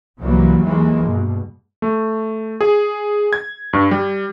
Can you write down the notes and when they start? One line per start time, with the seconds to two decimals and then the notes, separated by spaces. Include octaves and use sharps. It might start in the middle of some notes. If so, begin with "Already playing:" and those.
0.19 C2 E3 F#3 G3 A#3
0.62 D#2 E3 G#3 A#3
1.04 G2 B2
1.82 A3
2.61 G#4
3.33 G#6
3.73 G2
3.91 G3